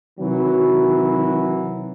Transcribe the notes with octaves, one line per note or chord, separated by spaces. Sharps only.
C3 D#3 E3 F#3